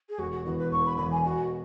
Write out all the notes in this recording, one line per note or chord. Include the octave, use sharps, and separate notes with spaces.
G#4
E1 F#4
F#4
E2 E3 B3 F#4
B4
E1 C#6
B5
E2 E3 B3 B5
G#5
B2 F#4